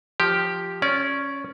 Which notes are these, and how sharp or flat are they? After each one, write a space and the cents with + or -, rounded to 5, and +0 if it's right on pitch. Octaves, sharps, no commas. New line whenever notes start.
F3 +0 G4 +0
C#4 +0 D5 -25